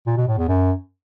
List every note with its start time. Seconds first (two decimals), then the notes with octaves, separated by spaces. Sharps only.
0.07 A#2
0.17 B2
0.27 A2
0.38 E2
0.48 F#2